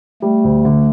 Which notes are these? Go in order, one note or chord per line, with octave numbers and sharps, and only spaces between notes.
G3 A3
D2
D3